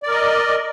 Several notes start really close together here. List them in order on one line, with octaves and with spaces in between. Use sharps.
D5 A#4 D#5